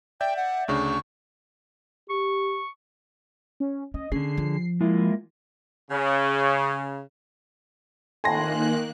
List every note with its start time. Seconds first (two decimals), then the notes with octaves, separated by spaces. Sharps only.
0.21 D5 E5 G5 G6
0.37 F#5
0.68 D2 C#3 D4 C#6
2.10 G4 C#6
3.60 C#4
3.94 C#4 D#5
4.12 D3 C#4 G#4 C7
4.37 F3
4.81 G#3 A#3 E4 F4
5.91 C#3
8.24 F2 A2 D#3 A#3 G#5 C6 F#6 A#6